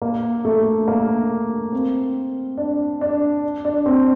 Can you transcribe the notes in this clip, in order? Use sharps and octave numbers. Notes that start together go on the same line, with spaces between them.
A#3
A3
A#3
C4
D4
D4
D4
C4